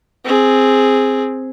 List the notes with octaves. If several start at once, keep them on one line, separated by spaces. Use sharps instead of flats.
C4 G#4